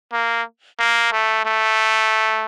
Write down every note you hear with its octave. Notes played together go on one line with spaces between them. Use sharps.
A#3
A#3
A3
A3